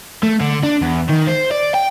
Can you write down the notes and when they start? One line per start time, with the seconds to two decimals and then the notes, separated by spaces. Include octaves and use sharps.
0.23 A3
0.40 D3
0.63 D4
0.82 E2
1.09 D#3
1.27 C5
1.51 D5
1.74 G5